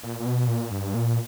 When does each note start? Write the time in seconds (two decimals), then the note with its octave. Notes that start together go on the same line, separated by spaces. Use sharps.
0.03 A#2
0.20 A#2
0.26 B2
0.48 A#2
0.71 G2
0.95 A#2